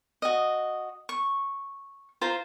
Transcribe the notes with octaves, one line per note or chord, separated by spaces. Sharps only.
F#4 D#5
C#6
F4 C5 A#5